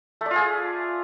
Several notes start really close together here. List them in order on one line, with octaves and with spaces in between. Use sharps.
A3 D5 F4 G#4